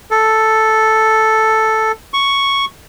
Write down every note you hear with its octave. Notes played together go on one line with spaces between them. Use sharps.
A4
C#6